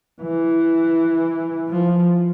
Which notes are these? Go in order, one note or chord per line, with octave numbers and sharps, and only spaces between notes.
E3
F3